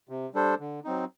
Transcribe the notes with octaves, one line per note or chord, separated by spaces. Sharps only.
C3
G3 D4 A4 C5
D3
F#3 C4 D#4